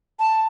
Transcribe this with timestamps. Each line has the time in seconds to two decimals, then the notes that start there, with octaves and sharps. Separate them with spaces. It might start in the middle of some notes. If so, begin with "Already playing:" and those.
0.19 A5